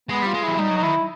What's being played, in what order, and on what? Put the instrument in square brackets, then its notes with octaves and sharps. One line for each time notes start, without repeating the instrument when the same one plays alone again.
[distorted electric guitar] G#3 [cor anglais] B3
[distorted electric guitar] G3 [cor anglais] F4
[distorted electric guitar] G#3
[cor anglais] E4
[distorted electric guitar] F#3
[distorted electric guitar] G3 [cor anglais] D#4
[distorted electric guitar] F#3
[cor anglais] D#4
[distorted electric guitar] D#3 [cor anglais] E4